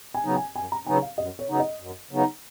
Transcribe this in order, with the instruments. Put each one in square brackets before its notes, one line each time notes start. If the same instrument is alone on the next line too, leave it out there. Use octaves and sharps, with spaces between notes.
[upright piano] G#5
[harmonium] C#3 F#3 B3 D#4
[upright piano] G#5
[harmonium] F#2 [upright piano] G#5
[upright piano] A#5
[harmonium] C#3 F#3 B3 D#4 [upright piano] G#5
[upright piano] F5
[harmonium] F#2 [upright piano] D#5
[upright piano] C#5
[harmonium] C#3 F#3 B3 D#4
[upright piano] D#5
[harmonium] F#2
C#3 F#3 B3 D#4